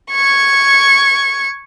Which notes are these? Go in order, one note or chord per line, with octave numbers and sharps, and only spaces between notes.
C#6 G#6